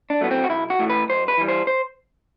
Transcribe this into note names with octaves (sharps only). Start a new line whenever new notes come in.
D4
A2 F#3 A3 B3
C4
F#4
B1 E4
F#4
A2 E3 A3
B4
F#2 C5
B4
E3 G3
C5
C5